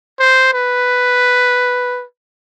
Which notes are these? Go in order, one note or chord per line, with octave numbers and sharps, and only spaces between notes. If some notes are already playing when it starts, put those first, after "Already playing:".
C5
B4